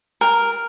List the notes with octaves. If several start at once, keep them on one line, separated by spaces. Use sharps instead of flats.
A#4